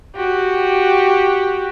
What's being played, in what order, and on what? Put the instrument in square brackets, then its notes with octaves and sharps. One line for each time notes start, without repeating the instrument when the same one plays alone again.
[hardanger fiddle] F#4 G4